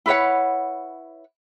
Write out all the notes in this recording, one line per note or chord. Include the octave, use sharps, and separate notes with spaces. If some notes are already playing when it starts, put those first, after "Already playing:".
E4 B4 C#5 F#5